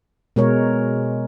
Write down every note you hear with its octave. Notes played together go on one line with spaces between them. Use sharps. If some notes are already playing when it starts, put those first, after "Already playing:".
B2 G#3 A#4 C#5